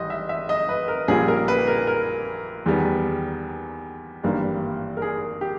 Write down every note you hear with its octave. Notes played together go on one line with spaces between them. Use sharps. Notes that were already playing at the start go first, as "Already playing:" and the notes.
Already playing: G#1 E3 G3 D#5
E5
E5
D#5
B4
A#4
A#1 A#2 G3 C#4 G#4
A#4
B4
A#4
A#4
E2 D#3 G3 B3
G#1 G2 E3 G3 A#3
A#4
G#4
G4